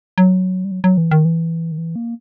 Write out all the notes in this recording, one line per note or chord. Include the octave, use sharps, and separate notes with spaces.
F#3
G3
F#3
F#3
E3
D#3
E3
D#3
E3
A#3